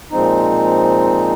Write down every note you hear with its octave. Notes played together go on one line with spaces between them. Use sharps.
A#2 F3 G#3 C4 D#4